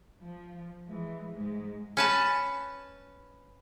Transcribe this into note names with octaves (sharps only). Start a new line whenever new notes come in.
F3
E3 G#3
G#2 G#3
C#4 B4 A5